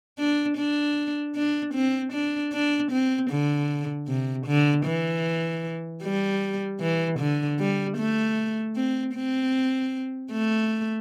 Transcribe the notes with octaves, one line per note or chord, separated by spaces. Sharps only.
D4
D4
D4
C4
D4
D4
C4
D3
C3
D3
E3
G3
E3
D3
G3
A3
C4
C4
A3